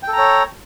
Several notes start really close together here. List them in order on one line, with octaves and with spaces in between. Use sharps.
G5 A4 A#5 C#5